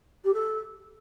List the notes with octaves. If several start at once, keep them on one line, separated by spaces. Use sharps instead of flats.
G4
A4